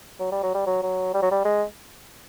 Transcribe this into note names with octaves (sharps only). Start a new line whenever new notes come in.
F#3
G3
F#3
G3
F#3
F#3
G3
F#3
G3
G#3